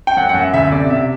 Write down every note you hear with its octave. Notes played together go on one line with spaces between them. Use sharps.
G5
F#2 F#5
F#5
F#2
E5
D2 E5
C3 D5
C3 E5